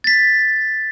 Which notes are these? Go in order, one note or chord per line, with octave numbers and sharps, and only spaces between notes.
A6 B6